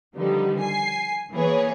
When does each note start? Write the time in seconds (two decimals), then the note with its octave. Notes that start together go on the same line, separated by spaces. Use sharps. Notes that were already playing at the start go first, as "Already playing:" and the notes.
0.16 D3 D#3 F3 G3 B3 D#4
0.59 G#5 C7
1.33 E3 A#3 B3 G#4 B4 C#5